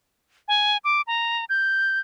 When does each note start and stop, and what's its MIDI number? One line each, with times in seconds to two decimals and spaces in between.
0.48 0.77 80
0.84 1.01 86
1.07 1.45 82
1.49 1.99 91